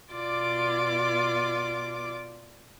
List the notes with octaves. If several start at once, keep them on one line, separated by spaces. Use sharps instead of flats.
B2 F4 D5 D6